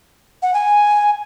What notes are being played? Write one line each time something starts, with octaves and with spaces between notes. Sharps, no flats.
F#5
G#5